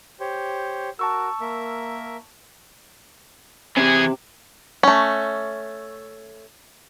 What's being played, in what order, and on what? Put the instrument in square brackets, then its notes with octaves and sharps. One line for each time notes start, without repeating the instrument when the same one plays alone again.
[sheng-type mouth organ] G4 C5 C#5
[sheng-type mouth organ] F#4 A#4 [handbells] A5 C#6 E6
[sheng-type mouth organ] A#3 A#4 E5
[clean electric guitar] C3 C4 [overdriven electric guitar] E3 G#4 [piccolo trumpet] G#6
[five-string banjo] A3 C#4